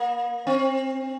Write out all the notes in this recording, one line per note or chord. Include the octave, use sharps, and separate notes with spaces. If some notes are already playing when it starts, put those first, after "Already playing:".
Already playing: A#3
C4